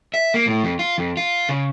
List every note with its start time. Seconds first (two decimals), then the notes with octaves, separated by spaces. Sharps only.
0.14 E5
0.34 A#3
0.47 A2
0.64 F2
0.79 F4
0.98 F2
1.17 F4
1.49 C#3